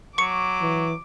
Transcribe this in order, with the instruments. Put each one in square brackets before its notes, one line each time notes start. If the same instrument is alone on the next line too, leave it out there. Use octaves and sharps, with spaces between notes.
[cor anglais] F#3 [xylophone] C#6 C#7 [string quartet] D6
[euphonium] E3